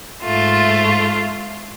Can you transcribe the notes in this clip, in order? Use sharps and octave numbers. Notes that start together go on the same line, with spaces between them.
G#2 A3 F4